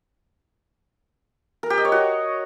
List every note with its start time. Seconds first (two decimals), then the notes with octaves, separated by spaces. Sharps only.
1.63 A#4
1.70 G4
1.78 D#5
1.85 C#5
1.92 F#4